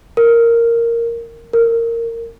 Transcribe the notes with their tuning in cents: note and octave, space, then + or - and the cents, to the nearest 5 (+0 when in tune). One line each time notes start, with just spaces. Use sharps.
A#4 -5
A#4 -15